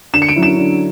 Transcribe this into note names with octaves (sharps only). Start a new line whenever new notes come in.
D3 E7
C#7
D7
F#3 C#4 E4
E7
D3